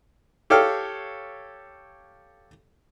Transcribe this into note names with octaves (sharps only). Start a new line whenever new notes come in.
G4 A4 C#5 F5 G5 F6